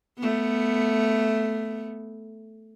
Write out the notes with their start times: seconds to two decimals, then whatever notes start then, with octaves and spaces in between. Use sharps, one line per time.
0.18 A3 B3